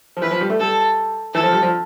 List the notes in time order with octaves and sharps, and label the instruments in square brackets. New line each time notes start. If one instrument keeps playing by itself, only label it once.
[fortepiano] F3
[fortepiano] E3 [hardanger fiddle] B4
[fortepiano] F3
G3
A3
[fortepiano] G3 [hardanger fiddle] A4
[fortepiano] E3 [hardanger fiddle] A4
[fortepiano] F3
G3
F3